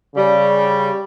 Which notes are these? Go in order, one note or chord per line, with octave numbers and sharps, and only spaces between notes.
C#3 G3